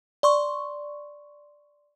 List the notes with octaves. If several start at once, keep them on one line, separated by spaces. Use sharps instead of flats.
D5 C6 C#6